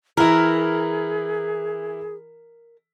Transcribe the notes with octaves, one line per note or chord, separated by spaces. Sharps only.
E3 E4 G#4 A#4